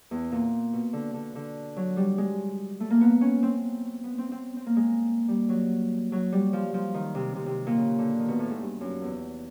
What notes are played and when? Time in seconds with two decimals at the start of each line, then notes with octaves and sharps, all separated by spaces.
0.11 E2
0.32 A#2
0.73 B2
0.93 D3
1.14 D3
1.35 D3
1.77 F#3
1.97 G3
2.18 G#3
2.80 A3
2.90 A#3
3.01 B3
3.21 C#4
3.43 C4
4.04 B3
4.18 C4
4.32 C4
4.57 C4
4.66 A#3
4.76 G#3
5.28 G3
5.49 F#3
6.12 F#3
6.32 G3
6.53 F3
6.74 F3
6.94 D#3
7.15 C3
7.36 C3
7.46 C3
7.67 A#2
7.78 C#3
7.99 D3
8.19 D#3
8.28 B2
8.39 A2
8.50 G#2
8.60 G2
8.81 F#2
9.02 E2